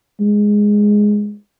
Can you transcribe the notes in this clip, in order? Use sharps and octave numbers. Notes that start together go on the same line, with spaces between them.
G#3